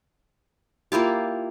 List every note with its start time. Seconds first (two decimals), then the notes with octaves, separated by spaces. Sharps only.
0.92 A#3 E4 F4 G4